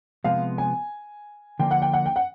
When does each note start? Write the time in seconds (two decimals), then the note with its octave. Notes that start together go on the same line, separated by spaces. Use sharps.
0.24 C3 F3 G#3 B3 F5
0.58 G#5
1.59 D3 F3 A#3 G5
1.71 F#5
1.82 G5
1.93 F#5
2.06 G5
2.16 F#5